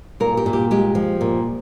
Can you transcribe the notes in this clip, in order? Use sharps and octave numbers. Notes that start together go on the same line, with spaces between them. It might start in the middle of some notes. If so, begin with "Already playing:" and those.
A#2 A#4
G4
A#2
G4
G#3 G4
F3
A#2